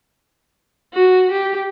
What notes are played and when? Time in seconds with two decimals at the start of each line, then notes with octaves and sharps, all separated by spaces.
0.94 F#4
1.32 G4